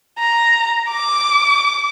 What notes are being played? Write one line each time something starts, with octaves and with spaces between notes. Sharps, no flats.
A#5
D6